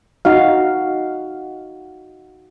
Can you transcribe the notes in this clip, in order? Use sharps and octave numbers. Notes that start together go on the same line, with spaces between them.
D#4 F#4 F5